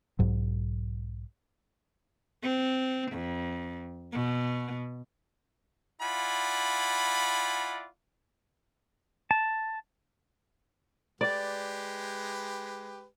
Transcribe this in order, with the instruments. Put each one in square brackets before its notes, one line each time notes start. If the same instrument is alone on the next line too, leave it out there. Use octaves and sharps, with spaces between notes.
[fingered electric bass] B1 G#2 F#3
[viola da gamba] C4
F2
B2
[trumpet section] E4 F4 D5 F#5 G#5 B5
[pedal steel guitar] A5
[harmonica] G#3 G4 B4 [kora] D5